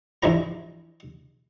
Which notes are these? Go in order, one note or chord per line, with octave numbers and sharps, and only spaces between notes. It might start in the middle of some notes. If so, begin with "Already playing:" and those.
G2 E3 F3 A#5